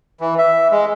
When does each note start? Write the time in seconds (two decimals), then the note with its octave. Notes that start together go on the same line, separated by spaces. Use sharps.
0.21 E3
0.38 E5
0.71 G#3